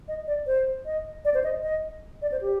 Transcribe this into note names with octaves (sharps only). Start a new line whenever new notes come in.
D#5
D5
C5
D#5
D5
C5
D#5
D#5
D5
C5
G4